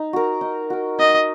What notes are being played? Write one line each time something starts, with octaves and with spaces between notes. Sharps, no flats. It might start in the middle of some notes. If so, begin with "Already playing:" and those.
Already playing: D#4
F#4 A#4
D#4
F#4 A#4
D#4 D#5